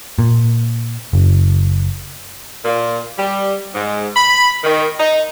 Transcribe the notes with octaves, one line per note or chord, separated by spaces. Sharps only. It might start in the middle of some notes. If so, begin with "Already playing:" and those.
A#2
F#1
A#2
G3
G#2
B5
D#3
D#4